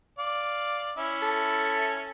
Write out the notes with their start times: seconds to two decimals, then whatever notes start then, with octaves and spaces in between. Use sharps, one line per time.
0.19 D5 F5
0.98 C#4 E4 E5
1.22 A4